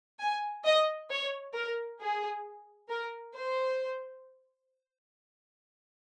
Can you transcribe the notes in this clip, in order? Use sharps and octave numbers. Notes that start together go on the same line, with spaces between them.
G#5
D#5
C#5
A#4
G#4
A#4
C5